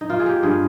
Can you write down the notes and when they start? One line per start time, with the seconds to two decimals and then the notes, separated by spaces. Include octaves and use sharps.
0.01 D#4
0.10 A#3 F4
0.19 G#4
0.26 G4
0.43 G2 G#4